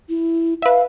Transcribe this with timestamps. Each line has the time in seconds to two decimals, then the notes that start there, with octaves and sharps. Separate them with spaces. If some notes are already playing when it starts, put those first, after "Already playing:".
0.09 E4
0.62 B4 E5 F5